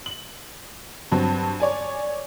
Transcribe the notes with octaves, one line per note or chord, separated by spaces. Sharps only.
F#7
G2 F#3 C4
C#5 D5 G#5